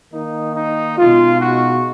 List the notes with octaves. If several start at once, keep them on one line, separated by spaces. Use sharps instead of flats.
D#3 A#3 D#4
D#4
B2 G#3 D#4 F4
F#4